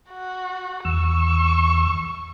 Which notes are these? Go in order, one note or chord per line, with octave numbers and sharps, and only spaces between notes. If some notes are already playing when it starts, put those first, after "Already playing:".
F#4
E2 C#6 E6